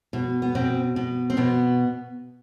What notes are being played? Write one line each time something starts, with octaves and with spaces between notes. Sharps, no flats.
B2
B3
B2 C4
B2
C4
B2 B3